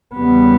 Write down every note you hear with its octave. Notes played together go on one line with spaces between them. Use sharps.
E2 C#3 G3 B3